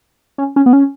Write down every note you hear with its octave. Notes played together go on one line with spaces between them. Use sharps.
C#4
C#4
B3
C#4